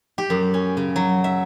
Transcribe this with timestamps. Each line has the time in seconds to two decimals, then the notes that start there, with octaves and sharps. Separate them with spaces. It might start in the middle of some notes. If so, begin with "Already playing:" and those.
0.18 G4
0.30 F#2
0.54 C#4
0.77 C#3
0.96 F#3
1.24 E5